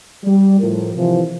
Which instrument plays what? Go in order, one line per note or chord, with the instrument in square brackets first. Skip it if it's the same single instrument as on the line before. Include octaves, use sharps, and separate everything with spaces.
[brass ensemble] G3
A2 F3 A#4
C3 E3 F3